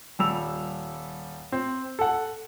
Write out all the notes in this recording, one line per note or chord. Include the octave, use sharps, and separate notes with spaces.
D#1 G3 E6 F7
C4
A4 F#5